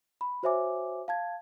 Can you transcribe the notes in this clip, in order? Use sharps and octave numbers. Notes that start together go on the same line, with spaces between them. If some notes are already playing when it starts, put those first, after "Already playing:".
B5
F#4 C5 C#5 E5 G#5 D6
F5 A5 G#6